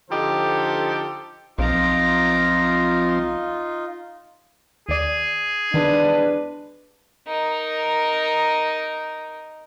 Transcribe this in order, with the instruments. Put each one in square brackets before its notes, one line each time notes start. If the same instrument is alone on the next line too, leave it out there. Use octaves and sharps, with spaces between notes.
[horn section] D3 F3 D#4 G4 A4 C5
[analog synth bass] B1 [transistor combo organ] F3 C4 [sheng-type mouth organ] D#4 F4 [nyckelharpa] A#5 D6
[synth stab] D#2 D5 [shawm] G#4
[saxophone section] E2 G#3 B4 [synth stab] D#3 [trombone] D4
[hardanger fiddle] D#4 A#4